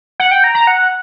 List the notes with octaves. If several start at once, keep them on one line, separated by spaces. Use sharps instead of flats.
F#5
G5
A#5
A#5
F#5